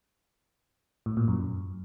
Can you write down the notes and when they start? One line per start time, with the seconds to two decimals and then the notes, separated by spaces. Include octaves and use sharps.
1.06 A2
1.17 A#2
1.28 F#2